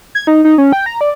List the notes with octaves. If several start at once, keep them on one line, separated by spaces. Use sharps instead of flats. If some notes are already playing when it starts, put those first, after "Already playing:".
G#6
D#4
D#4
C#4
G5
A#5
D5